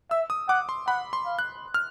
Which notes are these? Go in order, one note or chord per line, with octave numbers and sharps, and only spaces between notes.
E5 E6
D#6
F#5 D6
C6
F#5 B5
C6
F5
F#6
F6